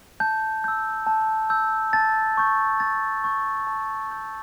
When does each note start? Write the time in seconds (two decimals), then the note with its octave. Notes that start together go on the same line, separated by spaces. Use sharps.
0.20 A5 G6
0.64 E6 G6
1.07 A5
1.50 E6 G6
1.93 A5 A6
2.37 C#6 G6
2.80 A5 A6
3.24 C#6 G6
3.67 A5
4.10 C#6 E6 G6